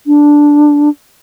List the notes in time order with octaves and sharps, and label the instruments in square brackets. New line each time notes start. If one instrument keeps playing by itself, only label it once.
[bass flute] D4